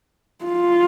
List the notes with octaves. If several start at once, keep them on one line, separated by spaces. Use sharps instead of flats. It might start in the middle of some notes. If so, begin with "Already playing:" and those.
F4